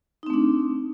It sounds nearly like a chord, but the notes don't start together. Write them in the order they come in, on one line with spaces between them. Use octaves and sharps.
D#4 C4 A3 D4